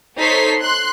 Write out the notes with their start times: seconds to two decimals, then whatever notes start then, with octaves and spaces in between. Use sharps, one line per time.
0.18 D#4 A4 C5 C#5 B6 C7
0.60 C6 F#6